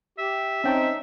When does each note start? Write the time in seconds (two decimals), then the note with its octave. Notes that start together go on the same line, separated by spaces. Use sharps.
0.18 G4 E5
0.64 C4 C#4 D#4 G5 A5